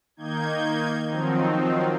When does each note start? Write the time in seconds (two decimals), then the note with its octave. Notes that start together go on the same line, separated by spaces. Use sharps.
0.17 D#3 A#3 D#4 G6 G#6
1.09 D#3 F3 F#3 C4 D#4